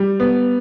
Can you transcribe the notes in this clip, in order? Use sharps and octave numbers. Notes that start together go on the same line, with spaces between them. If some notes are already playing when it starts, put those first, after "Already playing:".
Already playing: G3
B3